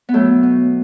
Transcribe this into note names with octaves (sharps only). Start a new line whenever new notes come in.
B3
F#3 A3
B2